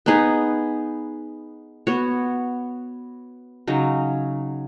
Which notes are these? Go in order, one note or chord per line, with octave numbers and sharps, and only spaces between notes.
B3 D#4 G#4 B4
B3 F#4 C#5
C#3 F#3 D#4